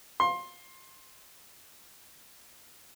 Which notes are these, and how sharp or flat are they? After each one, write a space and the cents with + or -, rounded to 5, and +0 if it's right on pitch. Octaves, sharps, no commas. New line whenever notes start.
C6 +20